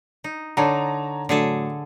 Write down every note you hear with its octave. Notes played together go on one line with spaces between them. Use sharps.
D#4
D3 D#4 C#5 A5 A#5
A2 D3 F#3 G#4 A4